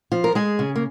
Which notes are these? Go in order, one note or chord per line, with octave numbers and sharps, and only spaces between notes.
F3 F4
A#4
G#3 G#4
C#3
A#3